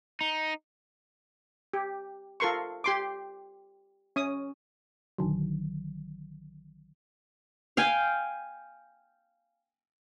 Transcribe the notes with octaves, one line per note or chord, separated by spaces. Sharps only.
D#4
G4
F4 A4 A#4 C6 C#6
G4 C6 D6
C#4 D#6
A#1 D3 D#3 F#3
F5 G5 G#5